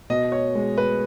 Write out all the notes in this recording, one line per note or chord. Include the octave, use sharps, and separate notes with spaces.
B2 D#5
C#5
G#3
B4